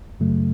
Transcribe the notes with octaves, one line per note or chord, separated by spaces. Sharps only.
F#2 C#3 F#3 A3